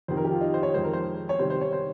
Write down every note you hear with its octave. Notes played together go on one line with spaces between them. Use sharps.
F2 C3 D#3 C5
A#4
G4
F4
D#4
C5
C#5
F2 D#3 G#3 C5
A#4
C5
C#5
C3 D#3 G3 C5
C5
C#5
C5